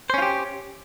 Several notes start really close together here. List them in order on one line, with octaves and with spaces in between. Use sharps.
C5 C#4 F4 G4